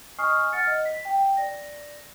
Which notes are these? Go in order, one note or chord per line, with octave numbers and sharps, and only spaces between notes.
D#5 G#5 C#6 D#6 F6 C7
F#5 F6 A6 C#7
D#5
B6
G5
D5 A#6